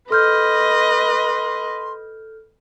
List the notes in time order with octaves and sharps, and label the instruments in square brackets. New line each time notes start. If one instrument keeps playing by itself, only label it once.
[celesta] A4 F6 G6 [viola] B4 D#5 [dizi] C6